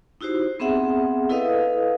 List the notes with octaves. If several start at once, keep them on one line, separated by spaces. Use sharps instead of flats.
D#4 E4 F#4 G4 C5
B3 C4 G#4 E5 F#5
E4 A4 B4 D#5 F5 D#6